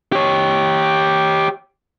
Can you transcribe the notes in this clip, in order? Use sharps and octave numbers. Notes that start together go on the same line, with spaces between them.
G4 C#5